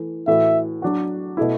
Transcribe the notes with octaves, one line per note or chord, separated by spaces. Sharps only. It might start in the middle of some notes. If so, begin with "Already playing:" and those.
Already playing: E3 A3
A2 E3 A3 F#4 E5
F#3 D4 F#4
B2 A3 E4